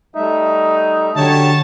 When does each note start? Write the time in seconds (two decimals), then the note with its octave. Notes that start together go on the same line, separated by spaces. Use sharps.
0.16 G3 A3 D#4 E5
1.16 D3 F#3 G4 C#5 A5